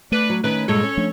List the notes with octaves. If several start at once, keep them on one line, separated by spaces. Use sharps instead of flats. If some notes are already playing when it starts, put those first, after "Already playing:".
A3 D4 B4
F#3
D#3 C#4 B4
G2 A#2 G#3 A4 C#5
C#4
F3 A3 D4